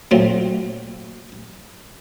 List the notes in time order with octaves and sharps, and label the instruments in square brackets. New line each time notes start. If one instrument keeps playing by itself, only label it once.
[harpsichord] A#2 F#3 A3 C4 F4